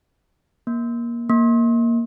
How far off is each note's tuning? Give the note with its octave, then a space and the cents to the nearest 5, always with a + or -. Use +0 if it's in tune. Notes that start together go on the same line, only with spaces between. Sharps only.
A#3 +20
A#3 +0